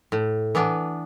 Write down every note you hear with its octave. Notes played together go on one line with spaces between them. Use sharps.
A2
E3 B3 D4